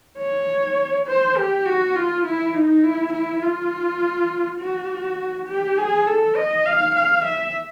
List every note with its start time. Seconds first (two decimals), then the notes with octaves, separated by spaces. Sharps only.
0.19 C#5
1.07 C5
1.37 G4
1.66 F#4
1.96 F4
2.25 E4
2.54 D#4
2.83 E4
3.13 E4
3.43 F4
4.60 F#4
5.48 G4
5.78 G#4
6.07 A4
6.36 D#5
6.66 F5
6.95 F5
7.25 E5